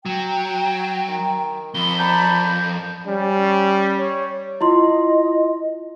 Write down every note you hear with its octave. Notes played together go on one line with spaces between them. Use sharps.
F#3 G5
D#3
F2 B5 G7
D5 A5 A#5 G6
G3 C#4
C#5
E4 F4 D#5 C6